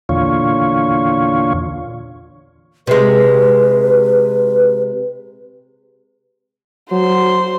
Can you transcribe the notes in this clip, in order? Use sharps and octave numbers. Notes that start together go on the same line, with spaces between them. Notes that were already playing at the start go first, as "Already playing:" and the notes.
E2 A#2 D3 F4 C#5
C3 G#3 B4
F#3 C5 C6